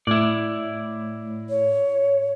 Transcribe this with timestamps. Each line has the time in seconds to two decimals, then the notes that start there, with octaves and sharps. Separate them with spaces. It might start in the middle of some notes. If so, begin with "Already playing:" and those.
0.07 A2 E4 D5
1.49 C#5